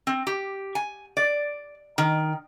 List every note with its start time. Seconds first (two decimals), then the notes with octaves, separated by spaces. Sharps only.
0.07 C4
0.27 G4
0.75 G#5
1.17 D5
1.98 D#3